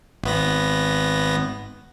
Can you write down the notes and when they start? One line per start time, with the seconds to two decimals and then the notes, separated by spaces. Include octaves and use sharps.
0.24 G#1 B3 A#6